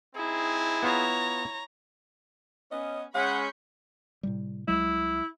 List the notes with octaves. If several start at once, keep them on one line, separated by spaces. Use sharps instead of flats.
C4 D#4 E4 G#4
B3 F4 C#5 A#5
B3 C#4 D#5
G#3 C#4 F#5 B5 C#6 G6
A2 C3 G3
C2 F#3 G#3 E4